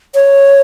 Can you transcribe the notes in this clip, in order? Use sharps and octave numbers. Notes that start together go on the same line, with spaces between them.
C#5